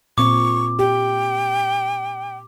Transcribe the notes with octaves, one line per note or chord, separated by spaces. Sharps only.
A#2 C4 C#6 D6
G4 G5